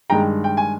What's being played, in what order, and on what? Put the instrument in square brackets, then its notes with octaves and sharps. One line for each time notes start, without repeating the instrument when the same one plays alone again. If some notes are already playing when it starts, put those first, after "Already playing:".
[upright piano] G2 D#3 G#3 G5 A#5
G5
G#5